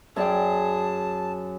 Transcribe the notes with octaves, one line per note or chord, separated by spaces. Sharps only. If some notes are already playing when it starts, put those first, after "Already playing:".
F#2 G#4 C#5 D5 G5 A5